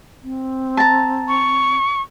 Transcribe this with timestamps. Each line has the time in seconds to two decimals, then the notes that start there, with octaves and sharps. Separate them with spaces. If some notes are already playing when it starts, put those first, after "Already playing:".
0.23 C4
0.77 A5 A#5
1.28 C#6